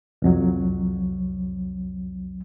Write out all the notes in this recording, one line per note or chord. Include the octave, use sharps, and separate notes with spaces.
C2 F2 F#3